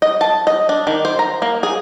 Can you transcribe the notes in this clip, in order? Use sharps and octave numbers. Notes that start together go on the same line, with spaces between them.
D#5
A5
D#5
D4
D#3
C5
A#5
A#3
G#4